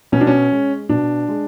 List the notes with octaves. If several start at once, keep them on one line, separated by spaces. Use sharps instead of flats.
B2 C#4
D4
C#4
G#3
B2 D4
G#3